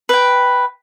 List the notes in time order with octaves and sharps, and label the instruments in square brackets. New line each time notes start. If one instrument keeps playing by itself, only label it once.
[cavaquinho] B4 G5